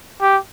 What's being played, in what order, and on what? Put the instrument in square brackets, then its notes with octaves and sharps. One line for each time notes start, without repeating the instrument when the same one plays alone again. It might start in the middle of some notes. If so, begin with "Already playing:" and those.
[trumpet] G4